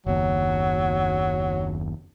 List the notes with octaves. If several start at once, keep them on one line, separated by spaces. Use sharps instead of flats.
F#1 D#2 F#3